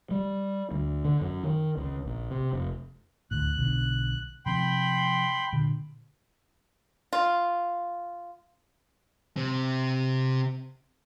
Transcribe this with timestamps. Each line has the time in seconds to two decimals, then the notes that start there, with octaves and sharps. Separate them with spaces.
0.11 G3
0.71 D2
1.05 D3
1.21 F#2
1.43 D#3
1.77 C#2
2.06 A#1
2.31 C3
2.53 F1
3.31 D2 A2 F#6
3.58 B1 B2 D3
4.46 C3 F3 C4 G5 B5 C6
5.53 A#2 D3
7.13 F4
9.37 C3 C4